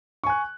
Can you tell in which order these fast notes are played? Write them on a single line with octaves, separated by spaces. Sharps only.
C#6 G#5 F#6